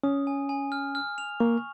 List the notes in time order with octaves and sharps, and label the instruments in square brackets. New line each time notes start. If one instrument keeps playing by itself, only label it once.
[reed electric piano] C#4 [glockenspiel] D#6
[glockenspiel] G#5
G#5
F6
F6
F7
[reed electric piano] A#3 [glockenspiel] C#6